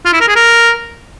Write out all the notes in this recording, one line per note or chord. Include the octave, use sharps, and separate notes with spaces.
F4
E4
A#4
G#4
A#4